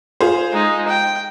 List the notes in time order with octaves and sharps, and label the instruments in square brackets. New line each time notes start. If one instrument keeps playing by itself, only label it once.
[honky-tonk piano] F4 G#4 C5
[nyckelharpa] G#3 D#4
G5